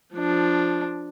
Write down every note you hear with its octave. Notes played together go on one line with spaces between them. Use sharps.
F3 D4